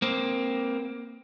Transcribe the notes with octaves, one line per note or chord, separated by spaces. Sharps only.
A#3 C4